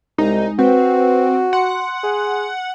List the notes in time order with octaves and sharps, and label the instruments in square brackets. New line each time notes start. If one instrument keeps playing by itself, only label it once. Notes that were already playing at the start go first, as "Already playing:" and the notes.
[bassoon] C2 [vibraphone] G#3 [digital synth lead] D#4
[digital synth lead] C4 [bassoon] F#4 [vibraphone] B4
[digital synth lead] F#5 [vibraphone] C6
[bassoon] G#4